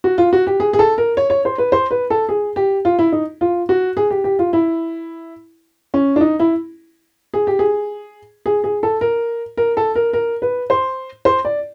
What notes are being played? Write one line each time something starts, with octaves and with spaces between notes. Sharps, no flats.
F#4
F4
F#4
G4
G#4
G#4
A4
A#4
C#5
C#5
C5
B4
C5
B4
A4
G#4
G4
F4
E4
D#4
F4
F#4
G#4
G4
G4
F4
E4
C#4
D4
D#4
E4
G#4
G4
G#4
G#4
G#4
A4
A#4
A#4
A4
A#4
A#4
B4
C5
C5
D5